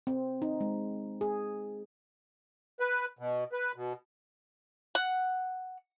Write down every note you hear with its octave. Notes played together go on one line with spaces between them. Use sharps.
C4
D#4
G#3
G#4
B4
B2
B4
B2
F#5